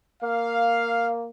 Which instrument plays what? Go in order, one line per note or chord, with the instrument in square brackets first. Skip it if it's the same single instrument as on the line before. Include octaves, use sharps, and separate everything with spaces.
[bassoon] A#3 [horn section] F5